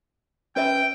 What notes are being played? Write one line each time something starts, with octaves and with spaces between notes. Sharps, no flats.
C#4 B4 E5 G5